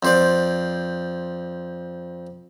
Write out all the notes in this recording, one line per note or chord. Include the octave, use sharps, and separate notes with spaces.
F2 C5 D5